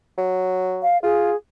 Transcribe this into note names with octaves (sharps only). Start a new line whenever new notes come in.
F#3
F5
F4 G#4